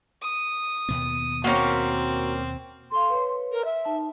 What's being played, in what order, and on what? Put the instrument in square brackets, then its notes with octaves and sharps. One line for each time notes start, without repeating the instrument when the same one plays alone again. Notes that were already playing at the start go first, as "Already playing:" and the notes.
[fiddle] D#6
[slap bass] D#2 B2 B3
[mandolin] A#3 C#4 [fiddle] C4 [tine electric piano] F#4 A#5
[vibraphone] A4 F5 [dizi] C6
[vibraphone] B4 C#5
[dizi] A#4
E5
[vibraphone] D#4 A5